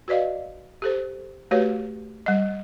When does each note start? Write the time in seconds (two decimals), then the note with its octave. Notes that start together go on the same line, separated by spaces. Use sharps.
0.08 F#4 B4 D5 D#5 F5
0.82 G4 A4 C5
1.51 A3 F#4 G4 B4 C#5
2.26 G3 D#5